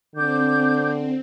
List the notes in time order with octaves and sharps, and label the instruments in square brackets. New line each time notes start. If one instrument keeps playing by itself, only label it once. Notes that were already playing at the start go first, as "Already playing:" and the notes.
[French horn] D3 [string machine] C4 [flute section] D6 G6